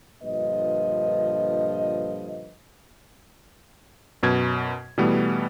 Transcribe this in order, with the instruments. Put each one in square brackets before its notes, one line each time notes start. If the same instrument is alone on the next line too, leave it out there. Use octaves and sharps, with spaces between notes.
[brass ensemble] G2 A#2 D3 F3 B4 D#5
[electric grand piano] F#2 B2 G#6
B2 E3 G3 A3 B3